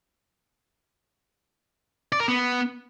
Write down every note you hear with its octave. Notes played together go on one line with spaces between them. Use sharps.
D5
A#4
B3